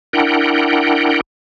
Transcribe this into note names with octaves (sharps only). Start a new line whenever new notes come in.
D4 E4 A#4 F#5 G5